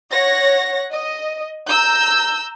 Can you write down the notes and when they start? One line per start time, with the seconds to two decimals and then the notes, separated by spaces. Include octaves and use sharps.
0.10 C#5 F#5 A#6
0.91 D#5
1.68 A#5 E6 G6